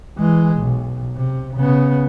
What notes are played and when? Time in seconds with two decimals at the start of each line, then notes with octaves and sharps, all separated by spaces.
0.18 E3 G#3
0.56 B1
1.16 C3
1.57 C#3 B3